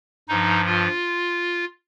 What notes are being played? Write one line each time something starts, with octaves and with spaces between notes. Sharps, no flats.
G2 F3 D#4
F4